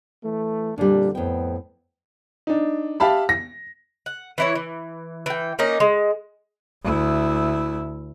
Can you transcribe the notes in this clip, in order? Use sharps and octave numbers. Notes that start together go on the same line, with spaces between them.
E3 A3
F2 A#2 D3 G3 D4
F2 A2 B3 G5
D4 D#4
G4 E5 F5 A5 B5
A#6
F#5
E3 E4 C#5
E3
E3 G5
A#3 C#4 D#4 D#5
G#3
D2 E4